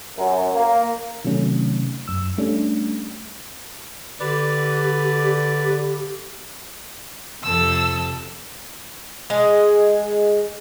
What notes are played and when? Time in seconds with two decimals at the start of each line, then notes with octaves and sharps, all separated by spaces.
0.18 F#2
0.55 A#3
1.25 C3 D#3 F#3 A3 C#4
2.08 F#2 E6
2.38 G3 A3 C#4 D4
4.20 D3 G4 B4 D5
7.43 F2 C3 A4 E6
9.30 G#3